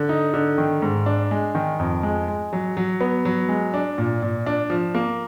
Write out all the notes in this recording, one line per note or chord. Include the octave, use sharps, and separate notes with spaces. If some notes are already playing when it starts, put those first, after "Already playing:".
Already playing: D3
D#4
D3
D#3
G#2
D4
G#3
D#3
F2
G#3
G#3
F#3
F#3
B3
F#3
G#3
D4
A#2
A#2
D4
F3
A#3